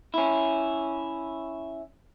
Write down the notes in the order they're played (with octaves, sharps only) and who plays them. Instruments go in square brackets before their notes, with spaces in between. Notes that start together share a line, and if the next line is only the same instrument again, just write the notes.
[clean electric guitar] C#4 E4